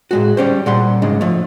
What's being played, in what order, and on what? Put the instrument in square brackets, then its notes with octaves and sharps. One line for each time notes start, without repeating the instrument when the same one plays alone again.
[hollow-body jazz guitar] A2 G#3 F#4
G3 C#4 C5
A#2 G3 F#5 C6
C#2 G#2 C#3 G#3 D4
F3 A3